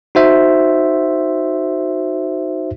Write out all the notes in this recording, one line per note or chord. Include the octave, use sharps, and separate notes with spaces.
D#4 F#4 C5 E5